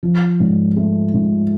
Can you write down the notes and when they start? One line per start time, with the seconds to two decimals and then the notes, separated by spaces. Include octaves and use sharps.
0.03 F3
0.40 G#2
0.76 A3
1.14 G#2